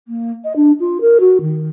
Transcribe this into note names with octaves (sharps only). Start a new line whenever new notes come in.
A#3
D#5
D4
F4
A#4
F#4
D#3